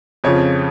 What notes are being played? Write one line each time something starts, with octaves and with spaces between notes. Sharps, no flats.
F2 C#3 F3 C#5